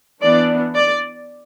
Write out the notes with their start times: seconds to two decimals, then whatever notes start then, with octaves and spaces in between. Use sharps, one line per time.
0.22 E3 B3 D4 D5
0.75 D5